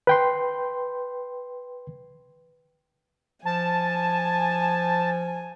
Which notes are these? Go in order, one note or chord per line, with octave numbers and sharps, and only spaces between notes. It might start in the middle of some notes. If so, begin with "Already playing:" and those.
B4 G5 C6
F3 G#5 A5